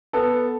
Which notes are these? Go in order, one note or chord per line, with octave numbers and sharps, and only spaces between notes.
B3 A4